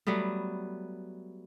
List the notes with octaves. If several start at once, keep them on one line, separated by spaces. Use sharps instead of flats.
F#3 G3 A3 B3